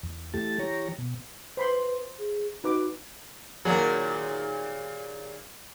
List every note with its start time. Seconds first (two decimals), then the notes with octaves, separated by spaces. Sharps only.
0.03 E2
0.34 E3 A3 G4 A5
0.59 E3 G4 C#5 A#5
0.98 B2
1.57 B4 C5 B5 C6
2.19 G#4
2.64 D#4 F#4 B4 D6
3.65 D#2 A#2 F#3 A#3 G#4